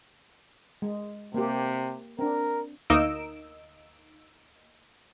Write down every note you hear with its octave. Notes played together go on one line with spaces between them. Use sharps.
G#3
C3 A#3 G4
C4 D4 A#4
D2 A#3 D#4 D#5 E6 D7